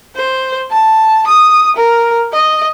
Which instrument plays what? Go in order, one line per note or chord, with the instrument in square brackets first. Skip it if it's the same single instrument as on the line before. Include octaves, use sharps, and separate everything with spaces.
[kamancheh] C5
A5
D#6
A#4
D#5